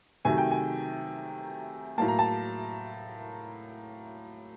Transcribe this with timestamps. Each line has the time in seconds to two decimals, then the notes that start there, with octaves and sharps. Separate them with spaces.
0.25 C3 D#3 F#3 A3 G#5
0.38 G5
0.51 G#5
1.98 A2 F#3 A#3 A5
2.08 A#5
2.19 A5